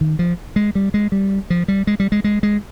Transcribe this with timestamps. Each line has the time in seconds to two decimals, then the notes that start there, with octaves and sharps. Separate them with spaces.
0.01 D#3
0.19 F3
0.56 G#3
0.75 G3
0.94 G#3
1.12 G3
1.50 F3
1.68 G3
1.87 G#3
2.00 G3
2.12 G#3
2.24 G#3
2.43 G#3